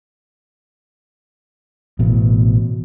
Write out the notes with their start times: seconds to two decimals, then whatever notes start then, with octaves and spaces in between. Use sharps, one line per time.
1.99 A1 B2